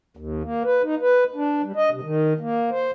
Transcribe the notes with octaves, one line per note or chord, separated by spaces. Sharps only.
D#2
A#3
B4
D#4
B4
D4
G3
D#5
C3
D#3
A#3
C5